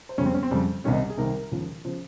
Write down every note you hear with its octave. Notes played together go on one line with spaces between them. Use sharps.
C5
F2 C#3 G3 C#4
C4
C#4
C4
F2 C#3 G3
C2 C3 D#3 G3 C#4
D#4
G#4
C2 C3 D#3 G3 A#4
D#2 C#3 F3
C#3 F3 C5